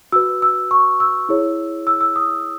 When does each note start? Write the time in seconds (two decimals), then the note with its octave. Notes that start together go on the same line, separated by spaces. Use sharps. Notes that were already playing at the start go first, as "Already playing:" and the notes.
0.12 F#4 B4 E6
0.42 E6
0.71 C#6
1.00 E6
1.29 E4 G#4 C#5
1.87 E6
2.01 E6
2.16 D#6